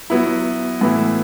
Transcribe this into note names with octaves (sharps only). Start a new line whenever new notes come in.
F#3 B3 E4
A2 E3 B3 E4